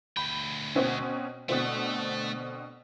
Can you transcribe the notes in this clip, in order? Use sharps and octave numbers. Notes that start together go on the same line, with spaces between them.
D2 G5 B5
B2 C4 C#4
B2 D3 A3 C4